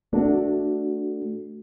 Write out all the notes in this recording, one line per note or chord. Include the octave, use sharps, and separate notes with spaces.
A3 D4 F#4